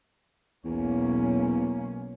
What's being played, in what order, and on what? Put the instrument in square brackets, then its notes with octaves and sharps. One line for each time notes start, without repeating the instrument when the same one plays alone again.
[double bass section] B1 A#3 C#4 [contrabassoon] E2